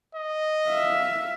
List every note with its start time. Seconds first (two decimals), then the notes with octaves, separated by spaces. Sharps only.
0.15 D#5
0.69 E5 F5